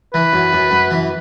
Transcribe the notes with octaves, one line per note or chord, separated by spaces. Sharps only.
E3 B4
F#2
F#2
F#2
E3